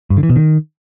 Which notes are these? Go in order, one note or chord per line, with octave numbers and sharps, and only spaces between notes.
G2
D3
E3
B2
D#3